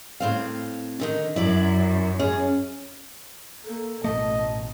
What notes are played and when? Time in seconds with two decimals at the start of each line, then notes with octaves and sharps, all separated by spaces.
0.20 A2 C4 F5
1.00 D3 D#3 D#4
1.36 F#2 E4 D5
2.19 C#4 G#4
3.65 A#3 A4
4.04 A1 B2 A3 D#5 A5